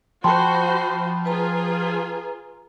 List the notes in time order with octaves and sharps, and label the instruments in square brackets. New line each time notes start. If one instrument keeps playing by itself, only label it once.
[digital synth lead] F3 [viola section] F#4 C5 [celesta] G5 A5 C6 [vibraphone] B5
[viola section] F4 G#4 [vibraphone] B4 G#5 A#5